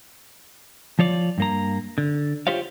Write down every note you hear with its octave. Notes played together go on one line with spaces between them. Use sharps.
F3 F4 C#5 D5
G2 A#3 A#5
D3
F4 G4 C5 C#5 F5